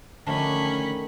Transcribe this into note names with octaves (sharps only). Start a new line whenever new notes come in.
D3 D#3 F3 G#3 A3 C#4 D4 B5